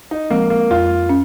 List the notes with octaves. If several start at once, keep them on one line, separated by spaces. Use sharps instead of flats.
D#4
F3 G#3 A#3 C4
A#3
F2 F4
C#4